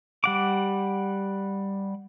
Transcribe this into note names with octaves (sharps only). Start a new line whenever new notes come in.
G3 F#5 D6